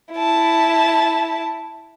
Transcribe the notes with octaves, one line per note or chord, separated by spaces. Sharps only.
E4 A5